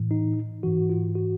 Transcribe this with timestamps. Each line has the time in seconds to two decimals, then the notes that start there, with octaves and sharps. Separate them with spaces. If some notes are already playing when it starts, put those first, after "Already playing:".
Already playing: A2 E3
0.11 D#4
0.63 G#2 E3 F#4
0.90 F4
1.15 F#4